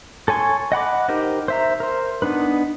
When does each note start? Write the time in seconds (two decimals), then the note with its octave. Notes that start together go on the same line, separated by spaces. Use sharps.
0.28 A4 C#5 G#5 C6 C#6
0.72 D#5 F#5 B5 D6
1.09 D#4 G4 A#4 C5 D#5
1.48 C5 E5 A#5
1.80 A#4 C5
2.22 B3 D4 D#4 B4